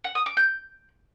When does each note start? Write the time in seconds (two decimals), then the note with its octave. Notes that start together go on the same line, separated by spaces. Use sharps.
0.04 F#5
0.15 D#6
0.26 D6
0.37 G6